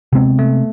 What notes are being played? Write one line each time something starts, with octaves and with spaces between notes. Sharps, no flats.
C3 G#3 B3 C4
A3